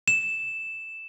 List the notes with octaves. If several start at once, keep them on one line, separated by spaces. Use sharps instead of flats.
E7